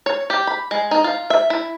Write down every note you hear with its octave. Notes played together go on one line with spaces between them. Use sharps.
C#5
G4
B5
G#3
D#4
F4
E5
E4